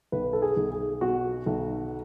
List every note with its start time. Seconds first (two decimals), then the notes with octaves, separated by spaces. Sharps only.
0.12 B1 B4
0.33 A4
0.42 G#4
0.57 B1
0.72 G#4
1.01 B2 F#4
1.46 B1